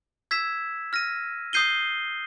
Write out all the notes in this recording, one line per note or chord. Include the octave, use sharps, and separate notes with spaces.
E6 G#6 B6 E7
F6 A#6 D#7
D#6 G6 C7 D#7 G7